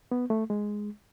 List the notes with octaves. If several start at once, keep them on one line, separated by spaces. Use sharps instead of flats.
B3
A3
G#3